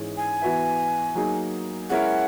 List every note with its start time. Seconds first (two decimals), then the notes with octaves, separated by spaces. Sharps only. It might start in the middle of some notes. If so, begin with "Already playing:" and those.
Already playing: G#2 E3 G#3 C#4 G#4
0.17 G#5
0.42 E3 B3 F#4 B4 E5
1.16 F#3 A#3 D#4 G#4
1.90 G#3 C#4 E4 A#4 F#5